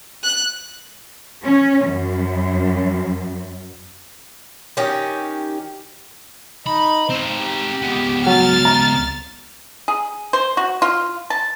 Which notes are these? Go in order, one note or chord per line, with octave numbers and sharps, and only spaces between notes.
F#6
C#4
F#2
D#3 C#4 G4
D#4 B5
C4 D#4 C5
G4
C#2 B3
F#3 F6 A6
A#5
G#4
C5
F#4
F4
A5